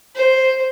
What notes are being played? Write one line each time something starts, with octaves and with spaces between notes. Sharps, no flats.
C5